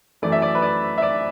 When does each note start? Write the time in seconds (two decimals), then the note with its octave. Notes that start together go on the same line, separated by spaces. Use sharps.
0.22 F#2 E3 A3 D5
0.32 E5
0.42 D5
0.55 B4
0.62 D5
0.98 E5
1.02 D5